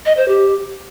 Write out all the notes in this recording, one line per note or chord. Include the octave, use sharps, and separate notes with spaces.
D#5
C5
G4